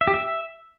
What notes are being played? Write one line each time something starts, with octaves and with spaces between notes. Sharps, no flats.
E5
G4
E5